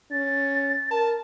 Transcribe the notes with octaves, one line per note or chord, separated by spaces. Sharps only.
C#4 A6
A#4 A5